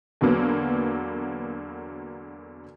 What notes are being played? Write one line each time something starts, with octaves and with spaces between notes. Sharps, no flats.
E2 D3 F#3 A#3 B3